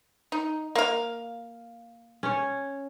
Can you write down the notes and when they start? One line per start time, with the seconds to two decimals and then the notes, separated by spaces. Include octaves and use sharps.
0.32 D#4
0.75 A#3 F5
2.23 C#4 C#5